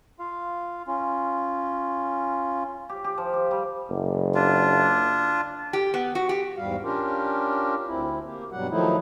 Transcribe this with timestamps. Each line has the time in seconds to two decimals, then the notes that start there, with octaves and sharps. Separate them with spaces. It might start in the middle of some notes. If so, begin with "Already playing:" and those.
0.20 F4 F5
0.88 C#4 F4
2.89 G4
3.04 G4
3.18 F3
3.33 G4
3.51 G3
3.90 F#1
4.35 D4 F4
5.73 G4
5.94 B3
6.15 F#4
6.29 G4
6.57 E2 G#2 G3 F5
6.83 C#4 D4 F4 G4 A#4
7.87 D2 C4 E4
8.24 A#3 G4
8.52 G2 B2 F#3 G3 F#5
8.70 D#3 F3 F#3 A3 D#4 E4